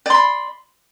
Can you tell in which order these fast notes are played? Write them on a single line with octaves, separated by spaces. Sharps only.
D5 C6 B5